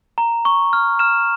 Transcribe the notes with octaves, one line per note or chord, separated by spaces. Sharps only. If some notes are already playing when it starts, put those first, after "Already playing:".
A#5
C#6
F6
F6 E7